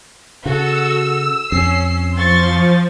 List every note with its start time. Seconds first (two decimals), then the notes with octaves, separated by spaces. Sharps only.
0.45 C#3 F#4 A4 E6
1.52 F2 C#4 C7
2.16 F3 C6 C#6 A6